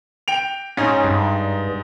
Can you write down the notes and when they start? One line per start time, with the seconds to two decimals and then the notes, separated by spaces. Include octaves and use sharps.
0.28 G5 D7 F7
0.77 G#2 C#4 D#4
1.04 G2